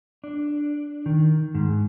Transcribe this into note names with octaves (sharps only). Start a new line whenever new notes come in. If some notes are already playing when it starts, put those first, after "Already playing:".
D4
D#3
G#2